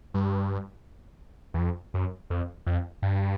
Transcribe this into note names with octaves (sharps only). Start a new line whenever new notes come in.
G2
E2
F2
F#2
F2
F2
G2